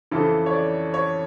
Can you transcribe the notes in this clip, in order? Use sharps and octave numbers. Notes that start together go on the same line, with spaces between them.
F2 C#3 E3 A4
C#5
D5
C#5